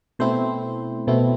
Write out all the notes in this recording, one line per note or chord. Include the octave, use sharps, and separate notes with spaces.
B2 A3 C4 E4 C5
B2 A3 C4 E4